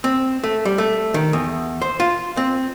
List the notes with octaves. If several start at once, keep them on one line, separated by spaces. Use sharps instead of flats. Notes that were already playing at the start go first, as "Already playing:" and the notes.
C4
A3
G3
A3
D#3
E2
C5
F4
C4